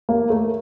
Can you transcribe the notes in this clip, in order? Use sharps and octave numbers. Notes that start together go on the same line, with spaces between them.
A#3
A3